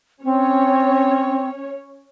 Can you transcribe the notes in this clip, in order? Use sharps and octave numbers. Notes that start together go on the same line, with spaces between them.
C4 C#4 C#5